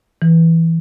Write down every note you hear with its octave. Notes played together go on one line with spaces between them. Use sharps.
E3